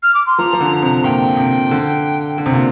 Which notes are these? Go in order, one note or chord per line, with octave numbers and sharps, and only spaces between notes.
F6
D6
C6
F3 A#5
F3
D3
C3
A#2 G5
C3
D3
D3
C3
A#2